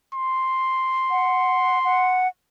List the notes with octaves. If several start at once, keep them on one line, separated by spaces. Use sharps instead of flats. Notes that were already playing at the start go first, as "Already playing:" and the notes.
C6
F#5
F#5